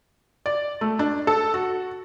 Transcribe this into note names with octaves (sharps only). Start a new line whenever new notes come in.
D5
A3
D4
A4
F#4